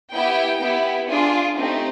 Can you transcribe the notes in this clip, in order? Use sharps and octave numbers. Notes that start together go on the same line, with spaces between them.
B3 E4 G4 G5
B3 E4 G4
D4 F4 G#4
A3 C4 D#4 G4